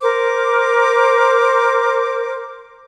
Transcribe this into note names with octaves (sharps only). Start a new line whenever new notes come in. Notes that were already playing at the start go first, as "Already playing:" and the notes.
A#4 C5 D6